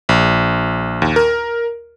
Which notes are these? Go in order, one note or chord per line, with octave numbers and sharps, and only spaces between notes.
A#1
D#2
A#4